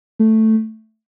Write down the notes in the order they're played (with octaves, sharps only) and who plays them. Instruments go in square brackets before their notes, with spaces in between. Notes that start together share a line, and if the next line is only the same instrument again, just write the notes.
[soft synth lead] A3